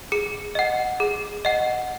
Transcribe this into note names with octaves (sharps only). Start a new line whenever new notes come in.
G#4 C#7
D#5 F#5
G#4
D#5 F#5